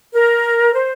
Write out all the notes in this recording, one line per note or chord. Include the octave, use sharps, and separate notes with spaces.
A#4
C5